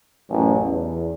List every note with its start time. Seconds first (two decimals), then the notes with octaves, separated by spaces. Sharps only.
0.29 A1 F#2 A3
0.63 E2